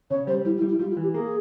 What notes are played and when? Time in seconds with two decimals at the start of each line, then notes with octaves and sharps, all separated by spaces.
0.10 C#3 C#5
0.27 G3 C5
0.45 G3 E4
0.57 E4
0.62 G3
0.68 E4
0.79 G3 F4
0.91 F4
0.97 E3
1.03 G4
1.14 A#3 G#4